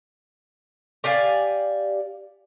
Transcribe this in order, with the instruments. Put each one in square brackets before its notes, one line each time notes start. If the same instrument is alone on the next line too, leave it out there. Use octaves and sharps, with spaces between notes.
[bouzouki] G4 D5 F5 G#5